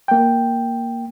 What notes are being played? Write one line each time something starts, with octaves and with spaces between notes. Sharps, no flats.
A#3 G5